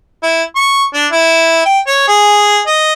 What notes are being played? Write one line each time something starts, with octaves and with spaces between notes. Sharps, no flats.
E4
C#6
D4
E4
G5
C#5
G#4
D#5